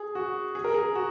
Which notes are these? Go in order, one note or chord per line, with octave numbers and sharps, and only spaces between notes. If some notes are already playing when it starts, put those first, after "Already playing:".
Already playing: G#4
F#4
G#4
A#4
G#4
F#4